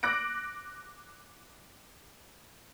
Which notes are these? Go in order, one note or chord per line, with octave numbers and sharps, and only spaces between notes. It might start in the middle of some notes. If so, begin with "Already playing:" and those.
D6 F#6 A#6 D7